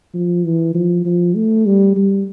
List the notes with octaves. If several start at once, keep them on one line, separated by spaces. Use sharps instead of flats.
F3
E3
F3
F3
A3
G3
G3